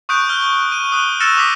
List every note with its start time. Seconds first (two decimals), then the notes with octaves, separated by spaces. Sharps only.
0.09 C#6 D#6 F#6 G6 D7
0.29 F6 F#6 G7
0.72 D#7
0.92 D#6 F#6 D#7 G7
1.20 E6 F6 A6 A#6 C#7 E7
1.37 D6 D#6 A#6 B6